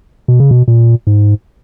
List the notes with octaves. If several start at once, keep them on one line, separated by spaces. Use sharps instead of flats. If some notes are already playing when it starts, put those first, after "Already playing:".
B2
C#3
B2
A#2
G#2